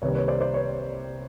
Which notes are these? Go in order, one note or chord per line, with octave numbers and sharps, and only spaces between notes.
C2 C3 D#3 G3 A#3 B4 C#5
B4 C#5
C5 D5
C5 D5
B4 C#5